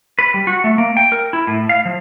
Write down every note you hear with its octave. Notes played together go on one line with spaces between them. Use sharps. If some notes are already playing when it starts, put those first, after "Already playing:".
B4
G3
F#4
A3
A#3
G5
A#4
E4
A2
F5
F3